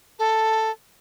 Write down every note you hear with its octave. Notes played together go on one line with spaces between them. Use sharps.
A4